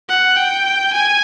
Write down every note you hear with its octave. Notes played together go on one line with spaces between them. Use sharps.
F#5
G5
G#5